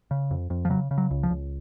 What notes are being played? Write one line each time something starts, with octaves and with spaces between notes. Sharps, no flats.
C#3
F2
F2
F3
C#3 F#3
C#3
F#3
C#2
F3
C#2